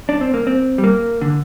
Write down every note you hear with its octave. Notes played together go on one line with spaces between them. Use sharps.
D4
C4
A#3
C4
G3
A#3
D3